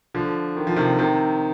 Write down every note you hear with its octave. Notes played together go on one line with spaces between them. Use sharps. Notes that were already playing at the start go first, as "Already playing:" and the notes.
D3 F3
D#3
F3
C3 D#3
C3 D#3